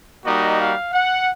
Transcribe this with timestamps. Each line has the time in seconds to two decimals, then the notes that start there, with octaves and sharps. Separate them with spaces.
0.24 G3 A#3 D#4 F#4 D#5
0.59 F5
0.92 F#5